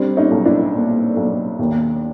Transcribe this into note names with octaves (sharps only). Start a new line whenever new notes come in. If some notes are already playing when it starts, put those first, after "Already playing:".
Already playing: G3 C4 D4
C#4 D#4
B1
D4 E4
A#2
B1
D#2